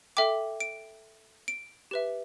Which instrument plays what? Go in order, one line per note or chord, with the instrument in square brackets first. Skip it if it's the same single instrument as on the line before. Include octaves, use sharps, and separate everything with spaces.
[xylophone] A4 E5 G5 D6
D7
D7
G4 B4 E5